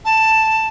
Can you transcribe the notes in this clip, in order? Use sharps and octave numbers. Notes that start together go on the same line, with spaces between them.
A5